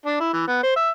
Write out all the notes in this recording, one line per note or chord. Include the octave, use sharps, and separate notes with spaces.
D4
E4
E3
B3
C5
E5